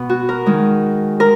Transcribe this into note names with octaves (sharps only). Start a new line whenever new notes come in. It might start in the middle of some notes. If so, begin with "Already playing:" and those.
Already playing: B2 B3
F#4
A#4
D#3 G#3
A#4